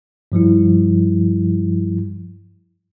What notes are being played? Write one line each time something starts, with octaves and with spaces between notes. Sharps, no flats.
G2 F3 G3 E4